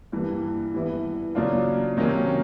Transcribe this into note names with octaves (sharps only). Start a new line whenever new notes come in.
G2 E3 G3 A#3
E3 G3 B3 E4
C#3 F#3 A#3 D4 F4
C3 D#3 F#3 A#3 C#4